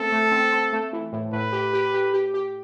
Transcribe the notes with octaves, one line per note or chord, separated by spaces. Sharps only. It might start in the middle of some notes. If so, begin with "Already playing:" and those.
Already playing: A3 C4 A4
A3
C4
C4
A3
E3
A2
A2 B4
G4
G4
G4
G4
G4